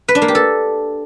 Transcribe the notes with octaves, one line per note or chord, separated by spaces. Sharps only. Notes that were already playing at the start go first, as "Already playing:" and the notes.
B4
D4
A#3
G4
A4